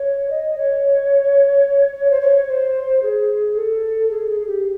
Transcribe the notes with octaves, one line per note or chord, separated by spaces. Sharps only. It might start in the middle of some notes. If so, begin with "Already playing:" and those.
Already playing: C#5
D#5
C#5
C#5
C5
C#5
C5
G#4
A4
G#4
G#4
G4